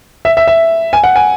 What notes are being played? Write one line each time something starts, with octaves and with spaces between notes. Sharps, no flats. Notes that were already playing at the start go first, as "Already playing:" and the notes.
E5
E5
E5
G#5
F#5
G#5